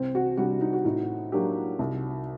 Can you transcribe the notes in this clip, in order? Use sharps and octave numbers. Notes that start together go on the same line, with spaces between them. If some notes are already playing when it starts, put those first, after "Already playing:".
Already playing: C2 C4
F#4
C3 G3 D4 F#4
D#4
F#4
A2 D#4
F#3 A#3 D4 G4
C2